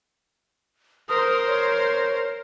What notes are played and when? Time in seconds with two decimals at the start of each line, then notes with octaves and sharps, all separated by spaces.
1.09 A#4 C5 D#6
1.47 C#5